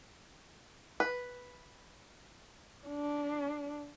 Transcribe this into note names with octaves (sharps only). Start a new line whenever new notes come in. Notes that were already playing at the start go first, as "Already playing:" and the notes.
B4
D4